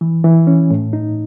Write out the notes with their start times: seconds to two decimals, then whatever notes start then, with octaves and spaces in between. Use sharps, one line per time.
0.01 E3
0.24 E3
0.47 C#4
0.70 A2
0.93 D#4